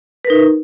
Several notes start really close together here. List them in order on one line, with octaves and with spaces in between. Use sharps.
B4 A#4 D#4